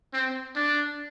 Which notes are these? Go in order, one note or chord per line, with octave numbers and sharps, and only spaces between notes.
C4
D4